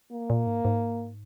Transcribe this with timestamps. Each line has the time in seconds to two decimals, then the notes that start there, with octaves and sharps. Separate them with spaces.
0.12 A#3
0.30 A#2
0.47 G#2
0.65 G#2